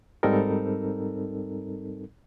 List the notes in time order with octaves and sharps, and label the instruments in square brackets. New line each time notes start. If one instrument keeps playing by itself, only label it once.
[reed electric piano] G#2 G3 C4 D#4 A4 A#4